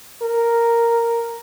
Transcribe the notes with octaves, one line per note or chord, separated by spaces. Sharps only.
A#4